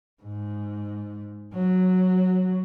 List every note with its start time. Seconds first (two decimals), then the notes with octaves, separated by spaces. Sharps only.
0.22 G#2
1.54 F#3